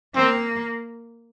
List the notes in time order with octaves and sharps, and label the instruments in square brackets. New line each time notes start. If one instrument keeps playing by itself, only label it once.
[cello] A#3 [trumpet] C4